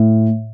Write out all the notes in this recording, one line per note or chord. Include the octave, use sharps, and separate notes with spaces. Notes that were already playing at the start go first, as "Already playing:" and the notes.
Already playing: A2